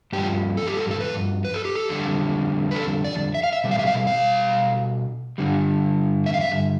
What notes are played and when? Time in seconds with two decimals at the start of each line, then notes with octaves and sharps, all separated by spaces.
0.13 G2 F3 G4
0.57 A4
0.67 G4
0.77 A4
0.91 A4
1.01 B4
1.45 B4
1.54 A4
1.65 G4
1.75 A4
1.88 F2 D3 G3
2.71 B4
2.75 A4
3.04 D5
3.35 E5
3.43 F5
3.53 E5
3.64 B2 G3
3.71 F5
3.79 E5
3.87 F5
4.07 F5
5.38 G2 D3 G3
6.26 E5
6.34 F5
6.41 E5